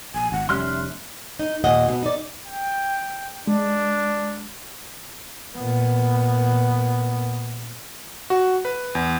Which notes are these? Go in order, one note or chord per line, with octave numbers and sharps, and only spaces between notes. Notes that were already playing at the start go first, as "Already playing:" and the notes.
A#1 G#5
G#1 F#5
F1 G3 C#4 E5 C6 F6 F#6
D#4
D#2 A#2 D#5 F#5
B2 B3
D#4 D5
G5
G#3 D4
A#2 B3
F#4
B4
E2